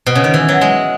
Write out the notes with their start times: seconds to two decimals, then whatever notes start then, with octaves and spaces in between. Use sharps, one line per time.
0.06 B2
0.15 C#3
0.24 D#3
0.34 E3
0.49 F#3
0.61 G#3